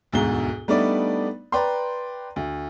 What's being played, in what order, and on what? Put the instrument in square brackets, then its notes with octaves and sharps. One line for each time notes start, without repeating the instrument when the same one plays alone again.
[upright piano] E1 D2 G#2 B2 G7
G3 A3 B3 D4 D#4 D5
B4 D5 G5 A#5 C6
D2